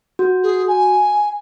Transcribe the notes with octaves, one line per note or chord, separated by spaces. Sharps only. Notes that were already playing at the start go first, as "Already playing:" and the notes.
F#4
G#4
G#5